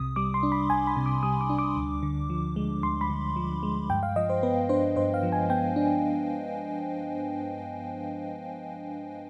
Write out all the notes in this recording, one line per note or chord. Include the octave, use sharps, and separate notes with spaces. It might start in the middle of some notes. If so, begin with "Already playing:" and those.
Already playing: C2 C3 D#6
G3 D6
C6
D4
B5
C2 G#5
B5
C3
D6
G3 D#6
D6
D4
D6
D2
D3
F3
G#3
D2 C6
B5
D3
F3
G#3
G2 G5
F5
F3 D#5
C5
B3 B4
D4 C5
G2 C5
F5
F3
G#5
B3 G5
D4